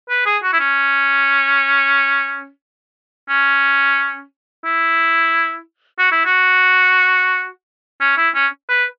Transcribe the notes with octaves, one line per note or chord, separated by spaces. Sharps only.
B4
G#4
F#4
E4
C#4
C#4
E4
F#4
E4
F#4
C#4
E4
C#4
B4